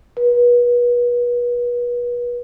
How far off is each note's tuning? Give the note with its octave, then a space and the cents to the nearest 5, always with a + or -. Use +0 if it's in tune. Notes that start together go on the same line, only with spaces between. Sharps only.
B4 -35